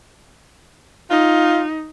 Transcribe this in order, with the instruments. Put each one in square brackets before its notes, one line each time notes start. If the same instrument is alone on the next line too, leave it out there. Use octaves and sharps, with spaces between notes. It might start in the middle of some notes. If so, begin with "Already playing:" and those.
[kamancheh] D#4 [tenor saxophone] F4